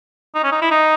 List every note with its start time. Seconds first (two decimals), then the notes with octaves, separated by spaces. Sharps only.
0.35 D#4
0.44 C#4
0.52 D#4
0.62 E4
0.71 D#4